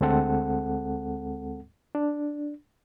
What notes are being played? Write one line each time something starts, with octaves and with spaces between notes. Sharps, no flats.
D2 G#3 C4 A4 F#5
D4